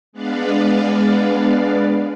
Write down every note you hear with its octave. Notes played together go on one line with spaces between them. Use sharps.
G#3 B3 D4 B4 D5 F5